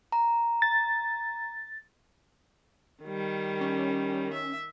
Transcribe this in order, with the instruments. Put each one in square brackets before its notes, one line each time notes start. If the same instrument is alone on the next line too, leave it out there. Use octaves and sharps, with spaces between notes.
[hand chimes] A#5
[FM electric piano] A6
[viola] D#3 G3
[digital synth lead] C#4
[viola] E5